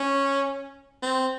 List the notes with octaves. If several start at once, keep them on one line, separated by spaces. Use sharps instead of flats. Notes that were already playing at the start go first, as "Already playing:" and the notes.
Already playing: C#4
C4